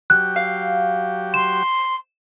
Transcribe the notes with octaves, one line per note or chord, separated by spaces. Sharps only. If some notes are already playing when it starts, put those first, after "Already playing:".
F#3 G4 F#6
F5
C6 E7